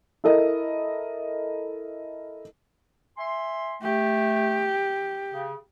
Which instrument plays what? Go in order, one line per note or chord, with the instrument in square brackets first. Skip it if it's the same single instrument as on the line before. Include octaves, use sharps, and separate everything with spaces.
[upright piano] E4 A4 A#4 D#5
[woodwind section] E5 G#5 C6
[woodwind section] A3 [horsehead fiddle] G4
[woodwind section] C#3